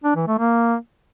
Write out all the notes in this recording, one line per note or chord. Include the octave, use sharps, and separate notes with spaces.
D4
E3
A3
A#3